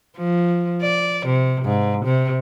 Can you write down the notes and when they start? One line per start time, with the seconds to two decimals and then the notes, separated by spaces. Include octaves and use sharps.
0.17 F3
0.82 D5
1.26 C3
1.65 G#2
2.05 C3